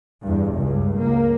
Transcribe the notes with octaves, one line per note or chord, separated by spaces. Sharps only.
E2 G2
G1 C#2 G2
C#2 A#3